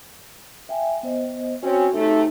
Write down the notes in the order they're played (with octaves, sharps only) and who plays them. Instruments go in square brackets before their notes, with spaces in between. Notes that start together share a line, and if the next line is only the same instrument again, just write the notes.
[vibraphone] E5 G5 G#5
B3 C5 D#5
[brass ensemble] C4 C#4 [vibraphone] F#4 C#5
[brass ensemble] C3 A3 [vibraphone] D#4